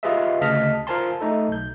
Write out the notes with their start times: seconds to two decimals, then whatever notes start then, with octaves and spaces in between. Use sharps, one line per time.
0.03 F4 G4 G#4 B4 D#5 E5
0.41 D2 C#3 D#5 A5 F6 B6
0.87 F4 A#4 C5 G#5 A5 C6
1.20 A3 D#4 A4
1.48 B1 G6